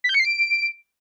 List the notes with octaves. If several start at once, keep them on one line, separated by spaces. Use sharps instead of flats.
B6
G6
C#7
C7
D7